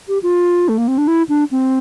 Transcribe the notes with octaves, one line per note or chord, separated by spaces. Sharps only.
G4
F4
A3
A#3
C4
D4
E4
D4
C4